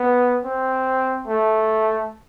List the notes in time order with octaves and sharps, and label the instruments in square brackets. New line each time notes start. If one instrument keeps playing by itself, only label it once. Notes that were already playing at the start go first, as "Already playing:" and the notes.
Already playing: [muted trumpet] B3
C4
A3